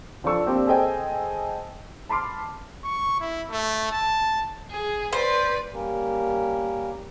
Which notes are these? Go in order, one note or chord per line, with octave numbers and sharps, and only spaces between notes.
F3 D4 A4 C#6 E6
A#3 C4 D4 G4
G#4 A4 C5 D#5 G5 G#5
A5 B5 C6 D6 F6
C#6
E4
A3
A5
G#4
B4 C5 D5
G3 A#3 C#4 G4 A#4